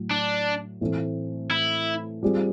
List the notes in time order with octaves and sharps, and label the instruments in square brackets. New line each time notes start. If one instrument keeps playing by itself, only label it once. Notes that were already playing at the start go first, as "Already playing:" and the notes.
Already playing: [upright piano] A2 F#3
[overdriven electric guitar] D4
[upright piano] A2 E3 A3 C4
[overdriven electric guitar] E4
[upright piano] G3 C4 F4 G#4